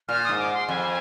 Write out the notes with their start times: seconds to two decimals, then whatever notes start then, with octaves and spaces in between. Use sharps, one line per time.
0.08 A#2 F6
0.24 G#2 D#6
0.39 D6
0.54 C6
0.69 F2 G#5